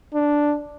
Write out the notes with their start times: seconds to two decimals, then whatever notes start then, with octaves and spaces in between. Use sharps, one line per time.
0.14 D4